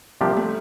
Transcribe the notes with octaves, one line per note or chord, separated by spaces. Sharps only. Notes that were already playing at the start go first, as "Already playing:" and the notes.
C3 F3 G3 A#3 D4 G4
A3